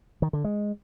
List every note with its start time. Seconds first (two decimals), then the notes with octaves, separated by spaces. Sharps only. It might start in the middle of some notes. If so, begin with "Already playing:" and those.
0.22 D#3
0.33 D3
0.44 G#3